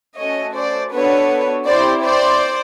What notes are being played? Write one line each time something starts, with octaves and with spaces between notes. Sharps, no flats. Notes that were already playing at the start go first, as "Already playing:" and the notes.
A3 C#4 F#4 A4 C#5 D#5
C5 D5
B3 D4 F#4 A4 B4 C#5
C4 E4 G4 C5 D5
C5 D5